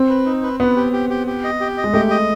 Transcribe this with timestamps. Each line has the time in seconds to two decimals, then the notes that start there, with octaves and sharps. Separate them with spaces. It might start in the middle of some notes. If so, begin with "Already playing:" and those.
Already playing: C4
0.09 B4
0.26 D#4
0.43 B4
0.60 B3 B4
0.76 G4
0.93 G4
1.10 G4
1.27 G4
1.44 D#5
1.60 G4
1.77 D#5
1.84 G#3
1.94 A3 G4
2.11 D#5